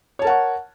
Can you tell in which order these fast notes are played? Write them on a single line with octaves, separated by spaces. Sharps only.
C#5 A5 A#4 F#5 C#6